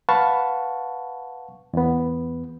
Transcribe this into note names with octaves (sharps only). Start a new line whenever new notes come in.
B4 F5 F#5 A5 B5 C#6
E2 B3